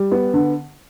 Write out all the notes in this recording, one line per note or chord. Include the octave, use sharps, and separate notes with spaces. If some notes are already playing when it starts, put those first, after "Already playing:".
Already playing: G3
B3
D3